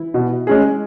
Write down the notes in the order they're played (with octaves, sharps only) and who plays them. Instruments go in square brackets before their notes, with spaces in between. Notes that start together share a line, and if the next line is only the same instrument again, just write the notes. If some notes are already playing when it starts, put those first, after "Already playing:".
Already playing: [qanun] E3 E4
[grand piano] B2
G#3 C#4 G#4